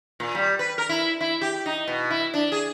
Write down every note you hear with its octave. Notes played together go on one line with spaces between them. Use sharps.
A#2
G3
B4
A#4
E4
E4
G4
D#4
B2
E4
D4
G#4